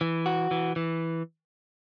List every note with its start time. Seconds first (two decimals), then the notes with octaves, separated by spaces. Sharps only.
0.01 E3
0.26 F#4
0.51 E3
0.76 E3